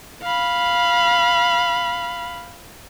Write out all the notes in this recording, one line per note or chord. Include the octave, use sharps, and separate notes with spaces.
F5 B5